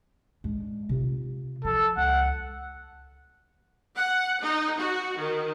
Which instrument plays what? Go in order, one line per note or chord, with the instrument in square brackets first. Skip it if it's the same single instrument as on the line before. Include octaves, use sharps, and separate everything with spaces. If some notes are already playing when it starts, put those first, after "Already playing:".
[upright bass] G#3 D4
C3 F4
[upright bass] F3 [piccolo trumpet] A4
[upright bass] C#2 [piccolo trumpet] F#5
[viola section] F#5
D#4
F#4
D#3